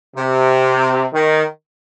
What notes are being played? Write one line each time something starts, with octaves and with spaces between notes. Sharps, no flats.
C3
D#3